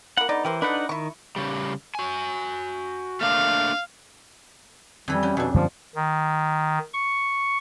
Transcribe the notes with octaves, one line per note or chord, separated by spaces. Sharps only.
A#3 E4 F#5
D3 B3 D#4 D5
E3 G4 A#4 C5
F3 D4 D#4 A4 B4 F#5
D#3 E4 C#6
C#3 G3
F#4 G#5
A3 A#3 D4 F5
F2 E3 G3
C#4 F#4 G4
F2 B2 D4
F#2 D3 F3 A#3
D#3
C#6